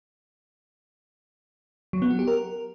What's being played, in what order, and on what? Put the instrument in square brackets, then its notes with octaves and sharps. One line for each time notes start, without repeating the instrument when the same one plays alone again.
[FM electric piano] F#3
B3
F#4
G4
A#4